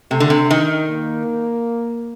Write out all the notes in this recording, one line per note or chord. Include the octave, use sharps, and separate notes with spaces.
C3 A3
D3
C3
D#3
A#3